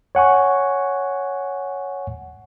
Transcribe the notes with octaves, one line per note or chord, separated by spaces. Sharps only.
C#5 F#5 G#5 C#6